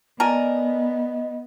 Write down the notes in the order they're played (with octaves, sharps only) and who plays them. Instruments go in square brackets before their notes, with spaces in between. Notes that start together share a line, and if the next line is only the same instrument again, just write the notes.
[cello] B3 [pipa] A#4 [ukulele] D5 G#5 A5 [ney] D#5